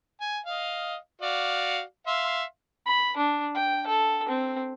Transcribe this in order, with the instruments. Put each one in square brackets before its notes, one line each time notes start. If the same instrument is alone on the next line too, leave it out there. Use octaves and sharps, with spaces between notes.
[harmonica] G#5
D#5 F5
F#4 D5 F5
E5 F5 C6
[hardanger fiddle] B5
D4
G5
A4
C4